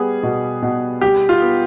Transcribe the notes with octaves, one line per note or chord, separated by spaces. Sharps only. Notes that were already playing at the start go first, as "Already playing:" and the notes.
Already playing: G3 B3 G#4
B2
B2
G3 G4
F4
B3